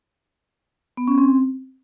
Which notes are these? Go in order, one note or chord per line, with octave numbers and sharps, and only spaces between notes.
B3
C#4
C4